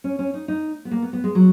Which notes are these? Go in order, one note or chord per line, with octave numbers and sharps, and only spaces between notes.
C#4
C#4
D#4
D#4
B3
A#3
B3
B3
G#3
F#3